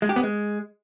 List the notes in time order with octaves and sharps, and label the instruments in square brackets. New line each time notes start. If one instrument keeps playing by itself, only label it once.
[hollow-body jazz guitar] G#3
G4
B3
G#3